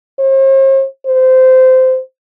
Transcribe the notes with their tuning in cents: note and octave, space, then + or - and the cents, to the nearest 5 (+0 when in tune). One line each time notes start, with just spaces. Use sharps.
C5 +45
C5 -20